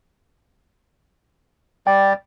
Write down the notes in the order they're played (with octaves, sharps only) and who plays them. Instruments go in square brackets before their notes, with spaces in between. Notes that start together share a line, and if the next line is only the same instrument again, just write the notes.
[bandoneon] G3 D5 [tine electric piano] G5